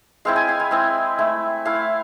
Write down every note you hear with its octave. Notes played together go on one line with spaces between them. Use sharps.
G#3 C4 E4 F5
G#5
F5
G#5
G#3 C4 E4
A3 E4
A3 E4 F5